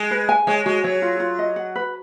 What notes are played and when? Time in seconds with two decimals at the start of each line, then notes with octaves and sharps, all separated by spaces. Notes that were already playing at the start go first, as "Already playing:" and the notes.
Already playing: G#3
0.11 B4
0.29 G#5
0.47 G#3 C#5
0.66 G#3 F#4
0.84 F#3 C#5
1.02 F4
1.20 F4
1.39 D#5
1.56 F#5
1.76 B4